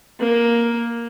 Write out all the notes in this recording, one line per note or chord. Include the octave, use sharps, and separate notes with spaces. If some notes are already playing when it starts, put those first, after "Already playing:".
A#3